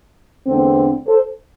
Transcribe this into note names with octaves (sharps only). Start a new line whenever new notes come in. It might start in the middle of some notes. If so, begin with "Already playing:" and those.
E2 D3 A3 C4
A4 C5